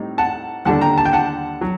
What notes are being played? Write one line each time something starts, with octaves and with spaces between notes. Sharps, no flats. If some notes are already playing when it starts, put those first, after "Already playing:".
Already playing: A2 G3 C4 D#4
F#5 A5
D#2 D3 G3 D4 F#5 A5
G5 A#5
A5
G5
F#5 A5
F#3